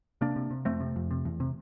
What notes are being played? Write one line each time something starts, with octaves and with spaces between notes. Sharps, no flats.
C3 A#3 D4
C3
C3
F2 A3 C4
C3
F2
C3
E2
C3